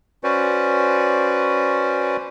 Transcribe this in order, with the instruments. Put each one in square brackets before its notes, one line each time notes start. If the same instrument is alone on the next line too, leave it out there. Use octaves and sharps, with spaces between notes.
[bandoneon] C#4 F#4 B4 C5 D5